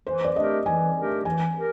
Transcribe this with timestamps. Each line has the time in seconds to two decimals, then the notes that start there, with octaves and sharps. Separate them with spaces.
0.07 E3 C5
0.24 D5
0.36 A3 D4 G4 A#4 D#5
0.66 E3 G#5
0.96 A3 D4 G4 A#4
1.25 E3 G#5
1.55 G4 A#4